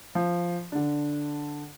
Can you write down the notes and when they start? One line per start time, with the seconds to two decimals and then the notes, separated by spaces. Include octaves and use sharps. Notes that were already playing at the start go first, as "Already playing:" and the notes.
0.15 F3
0.72 D3 D4